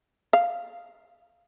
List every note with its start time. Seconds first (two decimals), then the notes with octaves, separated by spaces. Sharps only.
0.33 F5